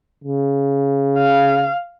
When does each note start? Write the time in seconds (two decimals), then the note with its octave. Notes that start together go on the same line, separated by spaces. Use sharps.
0.24 C#3
1.18 F5